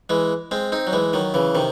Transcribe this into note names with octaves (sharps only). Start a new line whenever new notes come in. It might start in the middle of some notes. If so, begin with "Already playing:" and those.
E3 G#3
G#3 C4
C4 D#4
F#3
E3 G#3
D#3 F#3
C#3 E3
C3 D#3